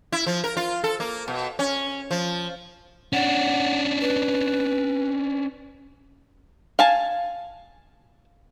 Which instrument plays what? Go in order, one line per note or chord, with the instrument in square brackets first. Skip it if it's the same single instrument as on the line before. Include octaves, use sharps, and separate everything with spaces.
[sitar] E4
F3
A#4
F4
A4
A#3
B2
C#4
F3
[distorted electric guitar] C#4 D4 [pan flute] F#5
[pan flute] B4
[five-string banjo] F5 G#5 A5